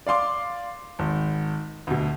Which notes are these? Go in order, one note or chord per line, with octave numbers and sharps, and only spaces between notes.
D5 F5 C6 D6
G#1
D2 B2